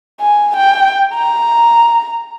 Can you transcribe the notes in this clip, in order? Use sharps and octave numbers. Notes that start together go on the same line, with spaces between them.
G#5
G5
A#5